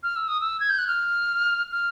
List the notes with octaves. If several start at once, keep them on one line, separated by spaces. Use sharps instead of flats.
F6
E6
D#6
E6
G#6
G6
F#6
F6
F6